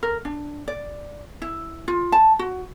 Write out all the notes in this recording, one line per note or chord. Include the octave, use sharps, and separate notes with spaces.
A#4
D4
D5
E4
F4
A5
F#4